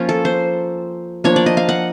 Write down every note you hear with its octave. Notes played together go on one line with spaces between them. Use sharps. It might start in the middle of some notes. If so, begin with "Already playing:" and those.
Already playing: F3 A#3 C#4 F4
A4
C5
F3 A#3 D4 C#5
D5
D#5
F5
F#5